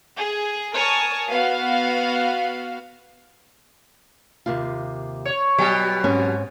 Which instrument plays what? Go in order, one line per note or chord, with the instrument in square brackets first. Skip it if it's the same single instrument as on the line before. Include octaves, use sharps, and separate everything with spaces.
[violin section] G#4
A#4 C#5 G#5 A5 C#6 D#6
B3 F#4 F5
[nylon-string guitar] D#2 C3 F4
[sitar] C#5
[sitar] B2 F#3 G4 [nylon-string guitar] D#5
[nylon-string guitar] G#2 C4 C#4